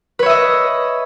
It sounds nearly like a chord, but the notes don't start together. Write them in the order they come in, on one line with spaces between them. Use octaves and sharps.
B4 C#5 E5 D#5